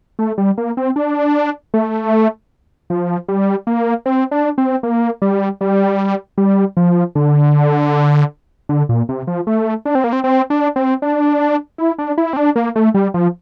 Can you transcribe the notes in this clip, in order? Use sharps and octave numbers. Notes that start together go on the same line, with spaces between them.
A3
G3
A#3
C4
D4
A3
F3
G3
A#3
C4
D4
C4
A#3
G3
G3
G3
F3
D3
D3
A#2
C3
F3
A3
D4
C4
A#3
C4
C4
D4
C4
D4
E4
D4
E4
C4
D4
A#3
A3
G3
F3